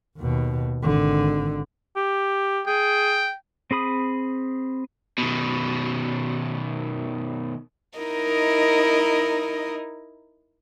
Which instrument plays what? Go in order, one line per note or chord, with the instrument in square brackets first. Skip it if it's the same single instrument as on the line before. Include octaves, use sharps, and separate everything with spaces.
[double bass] D#2 B2
G#1 D3
[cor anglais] G4
[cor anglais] G#4 [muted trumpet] G5
[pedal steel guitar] C4 G#4 B5 D#6
[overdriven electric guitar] B2 D#3
[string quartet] D#4 E4 A#4 D#5